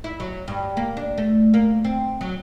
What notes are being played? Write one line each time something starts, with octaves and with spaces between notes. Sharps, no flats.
E4
F#3
G2
A#3
D4
A3
A#3
C4
F#3